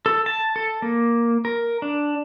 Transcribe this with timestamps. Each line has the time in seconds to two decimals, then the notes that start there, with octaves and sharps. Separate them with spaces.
0.06 A4
0.26 A5
0.56 A4
0.82 A#3
1.45 A#4
1.82 D4